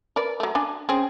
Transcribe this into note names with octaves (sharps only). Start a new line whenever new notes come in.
A#4 B4 D5
F#3 A3
D4 G#5
C4 C#4 G#4